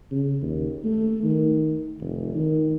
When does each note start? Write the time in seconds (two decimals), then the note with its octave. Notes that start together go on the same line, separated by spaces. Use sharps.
0.11 C#3
0.41 D#2
0.84 A3
1.23 D#3
2.01 F1
2.34 D#3